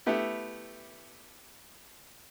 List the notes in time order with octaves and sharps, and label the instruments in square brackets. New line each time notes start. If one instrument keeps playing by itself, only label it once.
[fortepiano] A3 B3 E4 G4